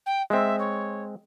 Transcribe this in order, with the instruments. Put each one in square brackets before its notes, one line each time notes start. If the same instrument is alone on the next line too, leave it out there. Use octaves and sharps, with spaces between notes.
[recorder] G5
[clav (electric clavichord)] G#3 C4 [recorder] E5
[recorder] C#5